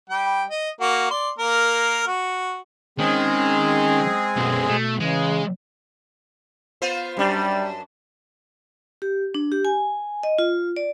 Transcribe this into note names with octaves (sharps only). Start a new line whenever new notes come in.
G3 G5
D#5
A#3 F#4
D5 C6
A#3 A#4
F#4
D#3 G#3 C4 C#4 G#4
B1 F#2 B2
B2 A3
C#3 E3 G#3
B3 F4 C5
F#2 G3 D4
G4
D4
G4
G#5
D#5
F4
D5